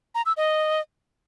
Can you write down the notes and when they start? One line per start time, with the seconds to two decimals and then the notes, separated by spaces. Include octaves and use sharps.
0.15 A#5
0.26 E6
0.37 D#5